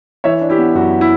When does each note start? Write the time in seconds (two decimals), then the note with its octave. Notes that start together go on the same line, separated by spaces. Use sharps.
0.24 E3 C#5 E5
0.41 D4
0.50 E4 G4
0.58 B3
0.75 F#2 F#4
1.01 E4